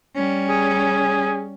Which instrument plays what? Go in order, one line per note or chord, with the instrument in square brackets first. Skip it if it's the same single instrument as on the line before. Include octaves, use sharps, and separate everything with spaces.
[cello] G3 C#4
[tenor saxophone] G#4